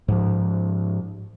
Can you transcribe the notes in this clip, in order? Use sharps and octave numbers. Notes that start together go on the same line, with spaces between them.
G#2 F3